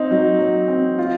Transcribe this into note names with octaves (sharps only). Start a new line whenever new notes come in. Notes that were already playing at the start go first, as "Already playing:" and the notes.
Already playing: C4 D#4
F#3
F#3
C4
F4